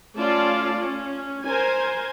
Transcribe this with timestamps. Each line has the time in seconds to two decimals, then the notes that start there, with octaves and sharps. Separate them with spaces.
0.16 A3 C#4 F4 D5 F5 A5
0.78 C#4
1.45 A#4 C5 G#5